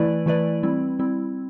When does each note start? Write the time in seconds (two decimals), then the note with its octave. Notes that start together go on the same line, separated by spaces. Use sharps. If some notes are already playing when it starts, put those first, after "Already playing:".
Already playing: E3 A3 E4 B4 D5
0.26 E3 A3 E4 B4 D5
0.63 G3 C4 E4
0.99 G3 C4 E4